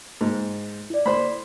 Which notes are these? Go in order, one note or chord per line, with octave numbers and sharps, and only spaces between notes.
G#2
E4 D5
A3 C5 B5